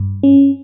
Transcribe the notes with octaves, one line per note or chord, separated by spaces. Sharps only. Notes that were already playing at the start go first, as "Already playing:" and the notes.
Already playing: G2
C#4